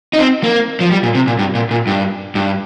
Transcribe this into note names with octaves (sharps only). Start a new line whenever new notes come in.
D#4
C4
A#3
F3
G3
A#2
C3
A#2
G2
A#2
A#2
G2
G2